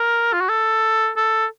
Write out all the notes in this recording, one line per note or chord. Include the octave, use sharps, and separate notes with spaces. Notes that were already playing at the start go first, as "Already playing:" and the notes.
Already playing: A#4
F4
F#4
A4
A4